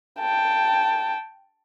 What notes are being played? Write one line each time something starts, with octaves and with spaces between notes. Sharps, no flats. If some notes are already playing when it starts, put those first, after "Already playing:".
G5 A5